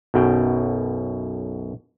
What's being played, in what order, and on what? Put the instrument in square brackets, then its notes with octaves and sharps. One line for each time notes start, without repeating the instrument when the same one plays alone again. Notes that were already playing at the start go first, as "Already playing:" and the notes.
[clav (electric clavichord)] B1 F#2 B2 G5